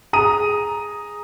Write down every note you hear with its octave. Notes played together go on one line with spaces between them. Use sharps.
G#4 A#5 D#6 D#7